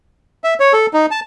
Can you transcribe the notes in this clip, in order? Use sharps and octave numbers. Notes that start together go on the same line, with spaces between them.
E5
C#5
A4
D#4
A5